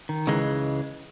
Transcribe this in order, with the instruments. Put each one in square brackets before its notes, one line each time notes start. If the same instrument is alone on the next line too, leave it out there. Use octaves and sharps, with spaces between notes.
[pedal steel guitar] D#3
[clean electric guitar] C#2 C#3 E3 G#3